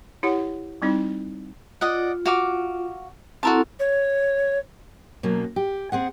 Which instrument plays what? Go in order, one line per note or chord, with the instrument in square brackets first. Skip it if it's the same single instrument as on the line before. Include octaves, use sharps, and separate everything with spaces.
[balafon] E4 G4 C#5 F#5
G3 C4 D#4 E4
[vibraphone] F4 [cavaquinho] D5 D#5 F#5
[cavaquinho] F#4 F5 D6
[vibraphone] C4 E4 A4 [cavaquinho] F#4 A#4 A5
[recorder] C#5
[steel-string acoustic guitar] B2 F#3 A#3 C#4
G4
C4 G#4 F#5